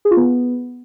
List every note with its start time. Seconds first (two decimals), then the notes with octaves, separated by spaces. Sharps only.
0.05 G#4
0.11 F4
0.17 B3